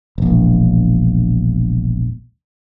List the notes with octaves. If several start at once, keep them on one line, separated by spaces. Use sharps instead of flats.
E1 A#1